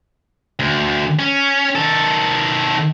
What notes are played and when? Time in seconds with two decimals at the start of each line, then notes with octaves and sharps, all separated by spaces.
0.59 D2
1.19 C#4
1.75 D#3 A4